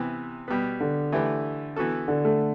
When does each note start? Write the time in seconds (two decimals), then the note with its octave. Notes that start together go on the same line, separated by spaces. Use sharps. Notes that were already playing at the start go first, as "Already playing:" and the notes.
Already playing: C3 E3 B3
0.48 B2 G3 B3
0.80 D3
1.12 E3 A3 E4 G4 B4
1.76 E3 B3 F#4 A4
2.08 D3
2.25 A3